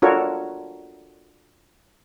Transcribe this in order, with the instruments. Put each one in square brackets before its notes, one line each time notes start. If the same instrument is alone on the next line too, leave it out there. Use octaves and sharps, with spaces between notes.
[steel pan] D4 F4 F#4 A4 A#4 C#5